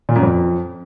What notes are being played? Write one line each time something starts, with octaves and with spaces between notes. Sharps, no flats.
A#2
F#2
F2